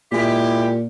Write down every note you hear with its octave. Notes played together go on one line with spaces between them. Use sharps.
A#2 G#3 E4 G4